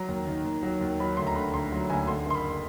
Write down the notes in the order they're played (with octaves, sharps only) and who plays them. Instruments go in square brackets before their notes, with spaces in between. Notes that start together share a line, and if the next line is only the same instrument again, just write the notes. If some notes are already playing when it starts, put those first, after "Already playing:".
Already playing: [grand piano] F#3 A#5
D#2
D#3
D#2
F#3
D#2
F#3 B5
D2 C6
A#5
D3 B5
D2 C6
F#3
D2 G#5
D3 C6
F#1 C6
B5